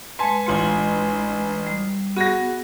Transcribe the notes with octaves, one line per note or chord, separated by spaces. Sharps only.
G#3 B4 G#5 A5 C6
A1 G#3 D4 F4 G#5 C6
G3
B3 F#4 G#4 A#6